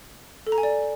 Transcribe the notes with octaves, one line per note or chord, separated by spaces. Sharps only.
A4
A#5
G#5
D5